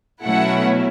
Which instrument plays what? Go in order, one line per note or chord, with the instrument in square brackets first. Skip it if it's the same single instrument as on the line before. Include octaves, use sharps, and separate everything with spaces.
[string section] B2 F#3 A3 C#4 E4 F#5